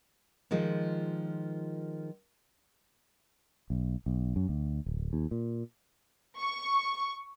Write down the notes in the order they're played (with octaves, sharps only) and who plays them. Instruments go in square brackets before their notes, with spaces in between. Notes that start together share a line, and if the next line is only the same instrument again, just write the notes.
[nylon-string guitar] D#3 F3 G#3 F4
[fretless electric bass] B1
B1
F#2
D2
D1
D#2
A#2
[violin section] C#6